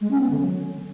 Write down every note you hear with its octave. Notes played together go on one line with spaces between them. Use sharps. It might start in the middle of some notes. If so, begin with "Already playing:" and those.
G#3
C#4
B3
D3
F#3